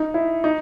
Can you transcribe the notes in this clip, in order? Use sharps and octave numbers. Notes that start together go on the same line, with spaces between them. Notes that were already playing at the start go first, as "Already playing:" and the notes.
Already playing: D#4
E4
D#4